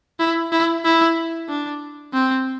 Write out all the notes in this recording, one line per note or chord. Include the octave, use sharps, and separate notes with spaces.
E4
E4
E4
D4
C4